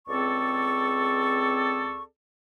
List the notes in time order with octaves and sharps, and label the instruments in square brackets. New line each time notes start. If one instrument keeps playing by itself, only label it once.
[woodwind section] C#2 C4 G#4 A4 D5 C#6